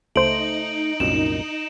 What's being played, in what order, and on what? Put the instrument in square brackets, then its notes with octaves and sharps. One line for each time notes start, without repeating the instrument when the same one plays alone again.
[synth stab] C#2 C5 [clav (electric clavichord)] A3 [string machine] D#4 [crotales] D7 F#7
[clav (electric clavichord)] C2 F#2 A#2 [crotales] E7